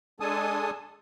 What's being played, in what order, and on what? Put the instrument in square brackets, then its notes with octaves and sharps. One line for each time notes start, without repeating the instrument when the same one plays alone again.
[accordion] G#3 D4 A4 G#5 A5 D#6